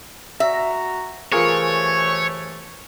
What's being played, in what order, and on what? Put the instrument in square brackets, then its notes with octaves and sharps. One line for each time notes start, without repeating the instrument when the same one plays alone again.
[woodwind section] F#4 A#5 [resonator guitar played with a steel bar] E5
[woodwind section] C3 E3 A3 [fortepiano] F4 G#4 A#4 [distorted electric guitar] C#5